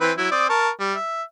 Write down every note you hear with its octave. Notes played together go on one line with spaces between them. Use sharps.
E3 C4 B4
F#3 E4
C4 D5 D#6
A#4 A5 C#6
G3
E5